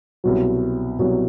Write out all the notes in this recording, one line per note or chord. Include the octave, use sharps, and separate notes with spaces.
C2 B2 F#3
C2 B2 F#3